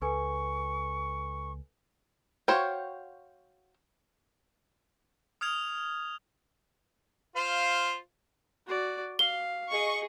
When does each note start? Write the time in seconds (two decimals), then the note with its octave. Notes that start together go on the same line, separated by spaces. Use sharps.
0.02 C#2 A4 B4 G#5 C#6
2.48 F#4 C5 C#5 F5 G5
5.41 D#6 F6 G#6 F7
7.36 F4 C5 F5
8.67 F#4 D5
9.19 F5 G7
9.71 G#4 D#5 C#6